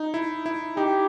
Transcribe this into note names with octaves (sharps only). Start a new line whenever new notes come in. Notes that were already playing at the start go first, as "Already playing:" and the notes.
Already playing: D#4
E4
E4
D#4 G4